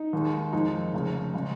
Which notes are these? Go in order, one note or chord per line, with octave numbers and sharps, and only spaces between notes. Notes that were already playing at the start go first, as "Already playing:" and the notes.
Already playing: D#4
D#2 D#3 G#3
F2 D#3 G#3 D#4
F1 F2 C#3
C#3 G#3